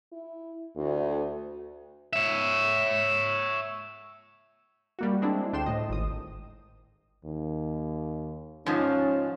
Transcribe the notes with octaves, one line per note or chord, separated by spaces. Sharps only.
E4
D2
C#5 E5
G3 A#3 F#4
G#3 C4 D4 E4
D2 D4 G5 C6 E7
A2 D#5
G#1 D#6
D#2
G#2 F3 C#4